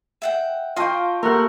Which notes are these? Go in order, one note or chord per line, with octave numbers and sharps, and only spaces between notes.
E5 F#5 G5
F4 D#5 F5 G5 A5 C6 C#6 D#6
A3 A#3 G4 A#4 F#5